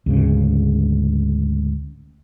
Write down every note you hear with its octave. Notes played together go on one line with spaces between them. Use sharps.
D2 G#2 C#3